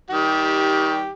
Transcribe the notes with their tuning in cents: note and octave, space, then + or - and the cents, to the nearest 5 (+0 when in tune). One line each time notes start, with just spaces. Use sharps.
D#3 +25 G3 -10 G4 +0